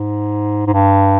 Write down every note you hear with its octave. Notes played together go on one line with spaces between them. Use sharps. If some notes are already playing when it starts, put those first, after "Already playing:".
Already playing: G#2
G#2
G2